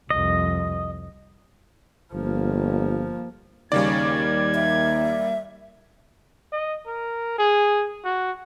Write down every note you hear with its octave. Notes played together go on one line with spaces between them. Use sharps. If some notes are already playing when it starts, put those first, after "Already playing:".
C2 F2 D#5
G1 F3 A#3
D#2 C#3 G3 A#3 D5 G#6
E5
D#5
A#4
G#4
F#4